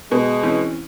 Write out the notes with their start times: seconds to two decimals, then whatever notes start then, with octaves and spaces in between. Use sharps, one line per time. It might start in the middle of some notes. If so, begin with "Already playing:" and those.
0.11 B2 G#3
0.43 E3 C4 C#4